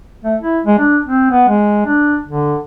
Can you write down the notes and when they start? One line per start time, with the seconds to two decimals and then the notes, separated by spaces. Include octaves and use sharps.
0.24 A3
0.42 E4
0.65 G#3
0.78 D4
1.05 C4
1.31 B3
1.49 G#3
1.86 D4
2.28 D3